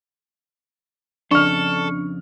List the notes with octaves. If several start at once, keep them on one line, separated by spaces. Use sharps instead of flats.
F2 C#3 D4 A4 C#6 F6